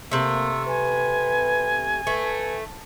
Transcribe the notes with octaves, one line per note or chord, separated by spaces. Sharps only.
C3 A3 A#3 E6
B4 G#5
A3 B4